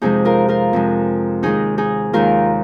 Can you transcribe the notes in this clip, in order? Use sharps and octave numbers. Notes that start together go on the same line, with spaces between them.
F2 C3 G#3 D#4 G#4
F4 A#4
F4 A#4
F2 C3 G#3
D#2 D#3 G#3 D#4 G#4
D#4 G#4
D#2 D#3 G#3 F4 A#4